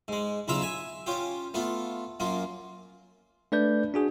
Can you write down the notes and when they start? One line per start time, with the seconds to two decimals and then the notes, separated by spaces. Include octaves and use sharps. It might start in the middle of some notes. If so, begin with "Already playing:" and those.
0.08 G#2 G#3
0.48 B1 C#3 E4 F4 E5 A#5
0.62 E5 G#5
1.06 C#4 F4 G4
1.54 A3 B3 F4
2.20 F#2 A#3 F4
3.52 A3 D4 B4 D5 G6
3.94 D4 F#4 G#4